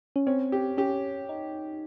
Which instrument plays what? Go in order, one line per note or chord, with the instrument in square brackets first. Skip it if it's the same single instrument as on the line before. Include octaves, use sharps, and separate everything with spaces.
[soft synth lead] C#4
[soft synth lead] C4 [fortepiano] C#4
[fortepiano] G4
[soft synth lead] C#4 [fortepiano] G4
[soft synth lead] D#4